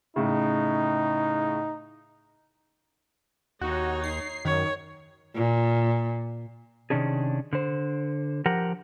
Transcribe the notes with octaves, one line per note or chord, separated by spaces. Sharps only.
A2 C#3 D#4
D#2 D#4 F#4 C#5
C7
F#2 D#3 C#5
A#2
C3 D#3 C#4 D4 G#4
D3 C5
F3 G4 A#4 F#5